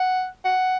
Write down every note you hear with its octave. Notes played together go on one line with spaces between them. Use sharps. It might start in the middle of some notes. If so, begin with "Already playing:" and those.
Already playing: F#5
F#5